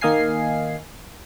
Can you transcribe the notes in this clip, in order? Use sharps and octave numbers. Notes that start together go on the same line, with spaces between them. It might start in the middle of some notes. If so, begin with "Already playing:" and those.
D#3 A#3 D#5 F5 G#5 C7